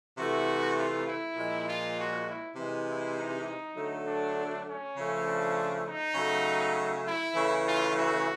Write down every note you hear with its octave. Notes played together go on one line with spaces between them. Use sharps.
C3 E3 A3 F#4
F4
E4
A#2 F3 G#3
F4
F#4
E4
C3 E3 G#3
E4
D#4
D3 F#3 A3
D4
C#4
C#3 F3 A3
D4
D#4
C#3 F#3 A3
E4
C#3 E3 A3
F4
F#4